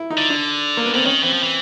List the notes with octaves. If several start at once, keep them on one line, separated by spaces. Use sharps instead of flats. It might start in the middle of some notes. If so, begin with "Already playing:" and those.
Already playing: E4
D#4
D3
D4
A#3
B3
D3 C4
D#3 C#4
E3 C4
F3
E3